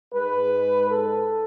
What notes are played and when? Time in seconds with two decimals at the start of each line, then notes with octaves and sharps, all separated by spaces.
0.13 G#2 G#3 B4
0.89 A4